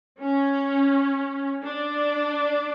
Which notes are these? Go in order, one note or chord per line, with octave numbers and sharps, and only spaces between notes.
C#4
D4